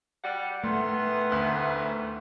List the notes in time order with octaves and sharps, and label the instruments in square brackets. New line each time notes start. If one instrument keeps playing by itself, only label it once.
[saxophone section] G3 F#5
[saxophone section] D#3 E3 B3 [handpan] A3 [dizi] C6
[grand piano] D2 F#6